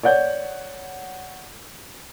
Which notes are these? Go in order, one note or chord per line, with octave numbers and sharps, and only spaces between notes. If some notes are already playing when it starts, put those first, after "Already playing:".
C#5 D5 F#5 G6